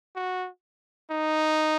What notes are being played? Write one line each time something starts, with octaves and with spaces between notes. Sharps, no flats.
F#4
D#4